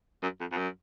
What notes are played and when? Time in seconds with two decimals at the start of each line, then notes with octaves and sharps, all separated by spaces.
0.23 F#2
0.40 F2
0.52 F2
0.57 F#2